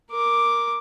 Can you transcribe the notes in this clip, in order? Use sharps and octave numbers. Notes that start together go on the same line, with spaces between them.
A#4 D6